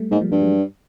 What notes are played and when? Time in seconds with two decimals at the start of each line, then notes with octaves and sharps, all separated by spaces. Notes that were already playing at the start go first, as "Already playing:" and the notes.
Already playing: G3 A3
0.11 G#2 G#3 A#3
0.21 F3 G3
0.32 G2 F3 G3
0.41 F#3 G#3